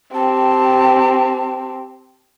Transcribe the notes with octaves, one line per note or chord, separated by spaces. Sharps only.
C4 G4 A5